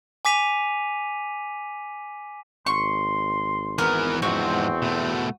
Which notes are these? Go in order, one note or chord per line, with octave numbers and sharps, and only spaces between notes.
G#5 D6 B6 D#7 F7
G#1 C6 C#6
E3 B3 A#4
E2 G#2 F3 C4 F#4
B2 A3